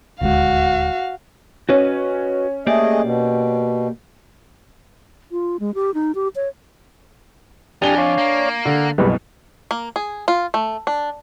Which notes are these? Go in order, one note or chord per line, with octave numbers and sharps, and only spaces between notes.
D#1 D2 G#3 F#4 F5
C#4 F#4 B4 D#5
A3 A#3 G4 G#4 D5 D#5
B2
F4
G#3
G4
D#4
G4
C#5
F2 D4 G4 G#5 D#6 F6 G7
C#5 D5 F5
A#3
D3 F#5
F#1 C2 B2 G3 G#3 B4
A#3
G#4
F4
A3
D4